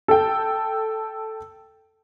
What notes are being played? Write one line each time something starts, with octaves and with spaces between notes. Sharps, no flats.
A4 G5